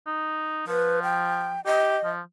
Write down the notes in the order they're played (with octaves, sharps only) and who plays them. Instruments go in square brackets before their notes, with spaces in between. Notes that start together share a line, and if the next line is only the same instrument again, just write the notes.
[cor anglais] D#4
[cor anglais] F3 [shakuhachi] B4
[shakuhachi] G5
[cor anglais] G4 [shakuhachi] D#5
[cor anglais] F3